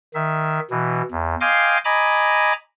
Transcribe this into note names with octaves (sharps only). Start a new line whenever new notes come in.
D#3 E5
B2 E3
E2
D#5 F5 G5 G#5 C6 D6
D#5 G#5 A#5 B5 D6